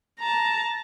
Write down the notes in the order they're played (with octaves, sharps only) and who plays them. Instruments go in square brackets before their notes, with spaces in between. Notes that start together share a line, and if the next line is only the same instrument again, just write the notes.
[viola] A5 A#5